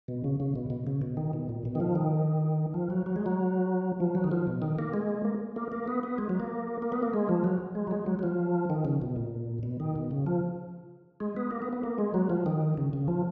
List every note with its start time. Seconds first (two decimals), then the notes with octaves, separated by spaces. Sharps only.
0.08 B2
0.24 C#3
0.40 C#3
0.56 B2
0.70 B2
0.87 C#3
1.02 B2
1.17 D#3
1.33 B2
1.49 A#2
1.65 B2
1.75 D#3
1.80 F3
1.95 D#3
2.74 F3
2.90 F#3
3.06 F#3
3.16 G#3
3.26 F#3
4.00 F3
4.15 F#3
4.24 D#3
4.31 F3
4.47 B2
4.62 D#3
4.79 A#3
4.94 G#3
5.25 A#3
5.56 A#3
5.72 A#3
5.88 B3
6.03 B3
6.18 G#3
6.29 F#3
6.40 A#3
6.82 A#3
6.92 B3
7.03 A#3
7.14 G#3
7.29 F3
7.44 F#3
7.75 G#3
7.87 F#3
7.91 G#3
8.06 F#3
8.19 F#3
8.23 F3
8.70 D#3
8.85 C#3
9.02 B2
9.16 A#2
9.63 B2
9.80 D#3
9.96 B2
10.11 C#3
10.26 F3
11.20 G#3
11.37 B3
11.51 A#3
11.62 B3
11.73 B3
11.83 A#3
11.98 G#3
12.14 F#3
12.30 F3
12.46 D#3
12.78 C#3
12.93 C#3
13.08 F3